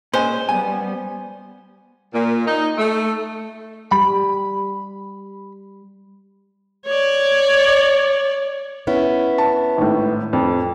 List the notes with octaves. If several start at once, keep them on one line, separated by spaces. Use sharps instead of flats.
A#2 G#3 C#4 C5 G#5
G3 B3 G#5
A#2
D#4
A3
G3 G4 B5
C#5 D5
B3 C#4 E4
A5
G#1 A2
F2